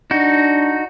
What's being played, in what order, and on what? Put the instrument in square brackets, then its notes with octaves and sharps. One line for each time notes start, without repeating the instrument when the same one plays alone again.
[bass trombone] D4 [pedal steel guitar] D#4 F#4